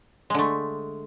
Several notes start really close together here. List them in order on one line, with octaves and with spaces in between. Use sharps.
G#3 D3 A3